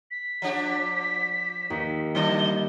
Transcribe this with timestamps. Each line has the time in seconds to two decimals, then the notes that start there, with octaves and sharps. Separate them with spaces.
0.11 B6
0.42 F3 D4 G4
1.70 D#2
2.15 D3 G3 D4 D#5 G7